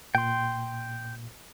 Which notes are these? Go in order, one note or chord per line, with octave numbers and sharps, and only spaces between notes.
A#2 G5 C6